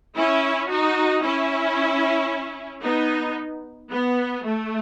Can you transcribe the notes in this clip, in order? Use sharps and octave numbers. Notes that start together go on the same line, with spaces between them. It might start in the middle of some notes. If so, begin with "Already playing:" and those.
C#4 E4
D#4 F#4
C#4 E4
B3 D#4
B3
A3